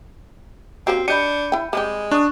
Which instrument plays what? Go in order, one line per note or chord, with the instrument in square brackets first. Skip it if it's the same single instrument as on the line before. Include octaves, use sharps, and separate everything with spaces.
[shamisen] G3 A#3 C#4 [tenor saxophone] C4 [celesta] F#4
[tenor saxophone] D4 [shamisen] G4 D#5 [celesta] B5 G6 D#7 [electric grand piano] C#7
[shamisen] E4 G5
[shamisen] G3 C4 G4 [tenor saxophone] G#3
[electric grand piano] D4 D#6 [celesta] C#6 F#6